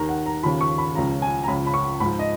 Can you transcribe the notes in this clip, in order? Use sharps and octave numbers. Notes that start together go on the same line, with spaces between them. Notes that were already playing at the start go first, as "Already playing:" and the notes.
Already playing: D#2 D#3 A#5
F#5
A#5
D#2 C#3 F3 B5
C#6
B5
C#2 C#3 F3 A#5
G#5
A#5
C#2 C#3 F3 B5
B5
C#6
G#2 F3 B5
D#5